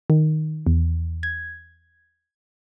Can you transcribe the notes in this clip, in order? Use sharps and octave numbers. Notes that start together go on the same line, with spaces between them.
D#3
E2
G#6